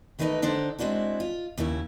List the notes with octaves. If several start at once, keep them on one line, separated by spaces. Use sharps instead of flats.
D#3 E3 A3 D#4 B4 D#5
D3 D4 D#4 A4 C5
G#3 C4 D4 E4 F#4
F4
D#2 C#3 C#4 E4